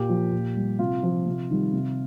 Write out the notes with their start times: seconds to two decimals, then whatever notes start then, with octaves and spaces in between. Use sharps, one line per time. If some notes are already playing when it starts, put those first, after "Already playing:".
Already playing: A#2 G4
0.09 F3
0.32 A#2
0.56 G3
0.79 C3 F4
1.03 F3
1.26 C3
1.50 D#3 G3
1.73 C3